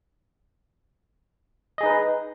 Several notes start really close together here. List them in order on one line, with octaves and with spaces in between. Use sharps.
D#5 G#4 D#4 B4